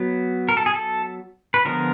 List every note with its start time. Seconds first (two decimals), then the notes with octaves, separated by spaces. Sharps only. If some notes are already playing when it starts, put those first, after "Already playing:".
Already playing: F#3 B3
0.49 A#4
0.57 A4
0.66 G#4
0.74 A4
1.54 B4
1.65 D3 F3 G#3 B3 A#4